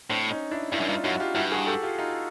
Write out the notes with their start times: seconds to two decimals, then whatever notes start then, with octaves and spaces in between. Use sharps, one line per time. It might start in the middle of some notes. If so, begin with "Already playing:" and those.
0.09 A2 C4 D4
0.31 C#4 D#4
0.51 D4 E4
0.72 G2 D4 E4
0.80 F#2
0.88 G2 D#4 F4
1.04 F#2 E4 F#4
1.20 F4 G4
1.35 G2 E4 F#4
1.52 F#4 G#4
1.67 G4 A4
1.82 F4 G4
1.98 D#4 F4